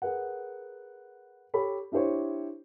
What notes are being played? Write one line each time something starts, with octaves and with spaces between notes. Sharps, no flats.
G#4 A#4 B4 F#5
G4 A4 C#5 B5
D4 E4 G4 C5 C#5